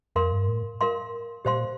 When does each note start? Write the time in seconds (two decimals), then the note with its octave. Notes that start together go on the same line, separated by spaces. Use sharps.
0.15 F2 A#4 F5 C6
0.32 G2
0.48 A2
0.81 A#4 F5 C6
1.45 A#2 G4 C5 F5 C6